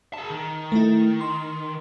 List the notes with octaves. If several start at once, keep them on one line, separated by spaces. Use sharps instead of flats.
G#4 A5
D#3
A3 E4
C6